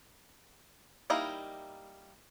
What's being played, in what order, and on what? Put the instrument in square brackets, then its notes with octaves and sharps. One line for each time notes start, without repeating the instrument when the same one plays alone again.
[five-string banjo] G3 A#3 D#4 E4 F5